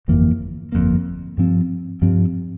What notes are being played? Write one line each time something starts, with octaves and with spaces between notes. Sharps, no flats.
G1 F2 E3 A#3
G1 F2 E3 A#3
G2 F3 C4
G2 F3 C4